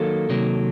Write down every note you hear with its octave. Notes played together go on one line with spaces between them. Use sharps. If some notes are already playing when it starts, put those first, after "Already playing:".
Already playing: D#3 F#3 A#3 A4
C3 D#3 F#3 A#3